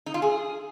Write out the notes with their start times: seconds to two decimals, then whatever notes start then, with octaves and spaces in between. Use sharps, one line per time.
0.06 D#4
0.14 F4
0.22 G#4